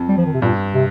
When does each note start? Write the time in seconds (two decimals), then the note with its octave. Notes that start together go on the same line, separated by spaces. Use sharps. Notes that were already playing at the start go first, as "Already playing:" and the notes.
Already playing: F2
0.09 G3
0.18 F3
0.26 D#3
0.34 C3
0.42 G2 A#2
0.74 C3